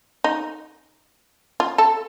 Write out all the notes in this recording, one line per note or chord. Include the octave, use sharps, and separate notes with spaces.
D#4
F4
A4